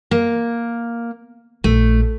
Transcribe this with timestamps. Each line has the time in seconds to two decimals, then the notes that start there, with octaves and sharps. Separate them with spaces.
0.11 A#3
1.64 A#1 A3